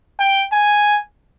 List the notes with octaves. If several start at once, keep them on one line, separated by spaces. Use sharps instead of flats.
G5
G#5